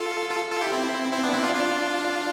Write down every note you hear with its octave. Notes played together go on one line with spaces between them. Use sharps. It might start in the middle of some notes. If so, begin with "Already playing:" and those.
Already playing: F4 A4
F4 A4
F4 A4
E4 G4
C4 E4
C4 E4
B3 D4
C4 E4
D4 F4
D4 F4